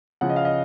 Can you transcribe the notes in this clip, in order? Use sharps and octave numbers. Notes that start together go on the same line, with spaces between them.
C#3 F3 F#5
D#5
F5
D#5